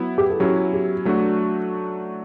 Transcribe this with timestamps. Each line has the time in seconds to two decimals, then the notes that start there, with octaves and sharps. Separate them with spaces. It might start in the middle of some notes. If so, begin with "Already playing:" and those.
Already playing: F#3 B3 E4
0.18 G4
0.30 A4
0.40 F#3 C#4 E4 G4
0.73 G4
1.05 F#3 A3 D4 F#4